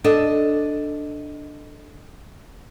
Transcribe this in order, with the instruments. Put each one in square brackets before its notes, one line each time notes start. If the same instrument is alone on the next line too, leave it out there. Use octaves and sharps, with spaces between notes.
[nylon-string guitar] D4 A4 D#5